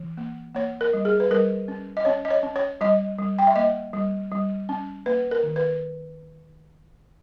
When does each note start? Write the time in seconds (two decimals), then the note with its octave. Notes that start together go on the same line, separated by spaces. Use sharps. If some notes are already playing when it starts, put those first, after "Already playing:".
Already playing: E3
0.17 A#3
0.55 A#3 C#5
0.81 A#4
0.93 G3
1.05 G#4
1.20 B4
1.31 G3 A#4
1.68 C#4
1.97 D#5
2.05 C#4 C#5
2.25 D#5
2.31 C#5
2.43 C#4
2.56 C#5
2.81 G3 D#5
3.18 G3
3.39 G5
3.47 E5
3.56 A#3 D#5
3.93 G3
4.31 G3
4.69 C#4
5.06 A#3 B4
5.31 A#4
5.43 D#3
5.56 B4